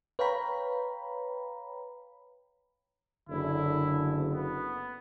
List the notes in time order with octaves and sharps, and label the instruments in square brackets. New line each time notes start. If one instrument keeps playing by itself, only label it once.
[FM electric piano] B4 C#5 F5 G5 A#5 B5
[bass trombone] F#1 [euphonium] D3 [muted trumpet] E4
[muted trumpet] B3